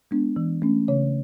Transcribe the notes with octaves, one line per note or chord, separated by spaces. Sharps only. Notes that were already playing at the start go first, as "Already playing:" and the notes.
G#3 B3 D4
E3
A3 C#4
C#3 C#5